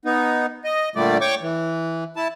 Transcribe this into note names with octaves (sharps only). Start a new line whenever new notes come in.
B3 D#4
D#5
A#2 D3 G3 A3 D5
C#5 G5 C#6 D6
E3
E4 A5